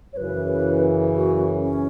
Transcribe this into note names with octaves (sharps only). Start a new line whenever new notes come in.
C#5
F#2 C#3 E3 B4
F#4
C#4